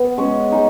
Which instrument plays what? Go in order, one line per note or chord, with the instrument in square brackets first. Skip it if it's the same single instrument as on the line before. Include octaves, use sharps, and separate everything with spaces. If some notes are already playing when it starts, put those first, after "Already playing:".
Already playing: [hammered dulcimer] B3
G#3 C#4 F#4
G#3 D#4